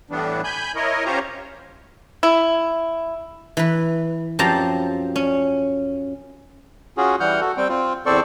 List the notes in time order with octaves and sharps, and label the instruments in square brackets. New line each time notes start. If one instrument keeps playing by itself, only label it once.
[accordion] A2 E3 G3 B3 D4
G#5 B5 G6
E4 A#4 C#5 D#5
C#4 F4 G4 C5 C#5 A#5
[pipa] E4
[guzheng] E3 B4
F#2 F3 C4 G4 A5 A#5
C#4
[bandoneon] C#4 F4 F#4 G#4
E3 G3 F#5 F6 G6
F#4 A4
G3 C4 G5
C4 F4
E2 C4 A4 C5 D5 C#6